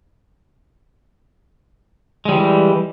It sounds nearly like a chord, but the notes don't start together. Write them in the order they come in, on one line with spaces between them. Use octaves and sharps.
G#3 G3 E3